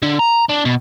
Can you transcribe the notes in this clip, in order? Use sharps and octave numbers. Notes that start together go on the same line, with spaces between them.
D3
A#5
D4
B2